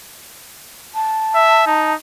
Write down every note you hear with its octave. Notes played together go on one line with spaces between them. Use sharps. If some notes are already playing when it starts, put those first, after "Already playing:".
A5
E5
D#4